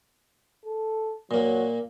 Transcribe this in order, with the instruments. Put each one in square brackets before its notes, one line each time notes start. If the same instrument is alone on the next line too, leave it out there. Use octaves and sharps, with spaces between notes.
[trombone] A4
[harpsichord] A#2 A#3 [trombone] F#3